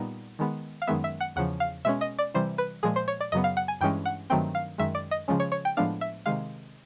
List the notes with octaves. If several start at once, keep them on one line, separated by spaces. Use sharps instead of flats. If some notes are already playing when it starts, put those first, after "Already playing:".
Already playing: A#2 G3 B3 D#4
D#3 G#3 B3
F5
F#2 D#3 G#3 B3 E5
E5
F#5
E2 C#3 F3 F#5
F5
B2 G#3 C#4 E5
D#5
D5
C3 E3 G3 C5
B4
A#2 F3 G#3 G#4
C5
C#5
D5
F#2 C#3 F#3 B3 D#5
F5
F#5
G#5
G2 E3 G#3 C#4 G5
F#5
G2 D#3 F#3 A3 C4 G5
F5
F#2 D#3 G#3 E5
D5
D#5
C#3 F3 G#3 C#4
C#5
C#5
G5
A2 F3 G#3 B3 D4 F5
E5
C3 D#3 G#3 F5